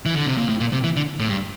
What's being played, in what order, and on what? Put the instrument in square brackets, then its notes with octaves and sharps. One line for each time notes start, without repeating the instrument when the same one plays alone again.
[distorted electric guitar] E3
D3
C3
A#2
A2
A#2
C3
E3
D3
A2
G2